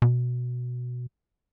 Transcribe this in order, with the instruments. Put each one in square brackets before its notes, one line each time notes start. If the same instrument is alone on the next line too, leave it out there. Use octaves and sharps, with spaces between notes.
[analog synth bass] B2